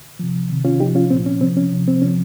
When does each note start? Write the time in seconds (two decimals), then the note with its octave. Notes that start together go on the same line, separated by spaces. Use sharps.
0.19 C3 F3
0.50 C3 D#3
0.65 C#4 F4
0.80 C3 F3 D#4 G4
0.95 C#4 F4
1.10 A#2 F3 C4
1.26 C#4
1.41 C3 F3 C4
1.57 C#4
1.72 C3 F3
1.87 C4
2.02 C3 F3 C#4